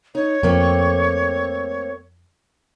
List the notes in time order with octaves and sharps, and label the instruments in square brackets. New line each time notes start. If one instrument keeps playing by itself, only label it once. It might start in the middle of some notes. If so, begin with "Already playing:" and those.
[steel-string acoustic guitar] D#4 [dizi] C#5
[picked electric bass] F2 F3 [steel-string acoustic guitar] A3 A#3 C4